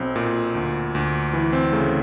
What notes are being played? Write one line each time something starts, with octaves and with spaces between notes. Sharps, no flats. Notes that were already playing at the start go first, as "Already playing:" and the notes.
Already playing: B1 C4
A#2
D2
D2
E3
C4
C#3 A3